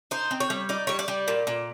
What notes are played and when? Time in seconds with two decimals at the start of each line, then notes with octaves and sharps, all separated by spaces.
0.11 D#4 C5
0.31 C4
0.40 C#5
0.50 G3
0.69 D#4 D5
0.87 G3 C#5
0.99 D5
1.08 G3
1.28 A#2
1.47 A#2